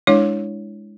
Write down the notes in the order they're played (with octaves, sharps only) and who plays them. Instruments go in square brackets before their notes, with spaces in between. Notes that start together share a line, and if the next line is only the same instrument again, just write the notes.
[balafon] G#3 D4 E4 C#5